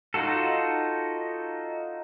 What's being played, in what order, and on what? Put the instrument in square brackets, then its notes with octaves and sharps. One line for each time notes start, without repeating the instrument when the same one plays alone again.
[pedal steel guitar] D#4 F4 F#4 A4